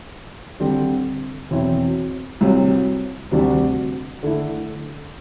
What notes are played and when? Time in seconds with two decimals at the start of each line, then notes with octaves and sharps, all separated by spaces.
0.60 D3 G3 C4
1.51 E2 B2 F#3 C4 E4
2.41 C2 C3 F#3
3.31 D2 C3 G3 D4 F#4
4.23 D3 A3 E4